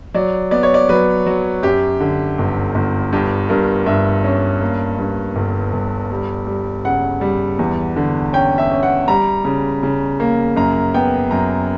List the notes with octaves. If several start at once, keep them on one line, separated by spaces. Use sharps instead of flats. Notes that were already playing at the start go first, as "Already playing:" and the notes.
F#3 D5
B3 D5
C#5
D5
F#3 B4
F#3
F#2 G4
D3
G1
G1
G2 G4
G2 A#4
G2 E5
C#4
A#3
G2
G1
G1
G3
G3
C#3 F#5
G3
E2
D3
C#4 G5
E5
C#4
F#5
G3 A#5
C#3
C#3
A#3
F#2 A#5
B3 G5
F#2 A#5